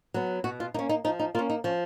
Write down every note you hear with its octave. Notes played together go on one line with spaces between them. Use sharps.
F#3 B3
B2 F#4
F4
A#3 C#4 D#4
D#4
F3 D#4
D#4
A#3 C#4 F4
D#4
F3 C#4